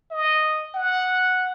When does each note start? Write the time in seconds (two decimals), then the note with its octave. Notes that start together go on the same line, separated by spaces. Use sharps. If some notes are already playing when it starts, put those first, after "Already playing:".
0.11 D#5
0.74 F#5